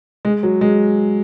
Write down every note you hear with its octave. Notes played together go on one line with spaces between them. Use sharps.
G#3
F#3
G#3